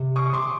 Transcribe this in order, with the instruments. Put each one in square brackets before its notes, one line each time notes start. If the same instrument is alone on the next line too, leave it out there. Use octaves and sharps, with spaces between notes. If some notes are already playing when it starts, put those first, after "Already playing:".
Already playing: [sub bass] C3
[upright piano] C#6 D#6
C6 D6